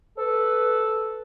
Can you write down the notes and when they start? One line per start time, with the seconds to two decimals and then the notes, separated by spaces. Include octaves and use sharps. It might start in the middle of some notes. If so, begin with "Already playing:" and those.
0.18 A4 B4